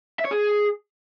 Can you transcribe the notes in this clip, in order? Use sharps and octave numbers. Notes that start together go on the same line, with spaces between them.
E5
C#5
G#4